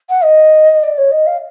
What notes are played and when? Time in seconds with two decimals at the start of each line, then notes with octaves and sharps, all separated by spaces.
0.09 F#5
0.23 D#5
0.83 D5
0.97 C#5
1.11 D#5
1.26 F5